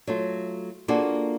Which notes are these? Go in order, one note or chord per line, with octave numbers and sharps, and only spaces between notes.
F#3 A3 F4
A#3 D4 F4 F#4 G#4 A4